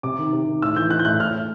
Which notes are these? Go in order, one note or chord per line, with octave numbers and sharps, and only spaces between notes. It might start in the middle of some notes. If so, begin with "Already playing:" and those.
C3 D6
D#3
C3
D#3
A2 E6
E3 G6
E3 F#6
G6
A2 F#6
A2 F6
A2